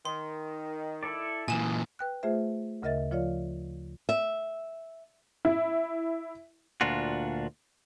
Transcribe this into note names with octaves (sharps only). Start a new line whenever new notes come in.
D#3 C6
E4 A4 D5
A#2 E3 D#5 G#5 E7
B4 G5 F#6
A3 F4 G#4 C5 E5
D2 C#3 A#4 D#5 E5 A6
F3 F4 C#5 D5 F5
E5
E4
D2 A#2 D4 F4 F#4